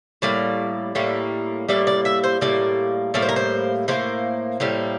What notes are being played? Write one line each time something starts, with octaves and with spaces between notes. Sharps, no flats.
A2 G3 A#3 D5
A2 G3 A#3
A2 G3 A#3 D5
D5
E5
C5
A2 G3 A#3 D5
A2 G3 A#3 D5
C5
A#4
C5
A2 G3 A#3 C5
A2 G3 A#3